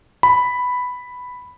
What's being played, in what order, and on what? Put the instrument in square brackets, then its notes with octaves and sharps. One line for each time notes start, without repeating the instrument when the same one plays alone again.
[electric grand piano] B5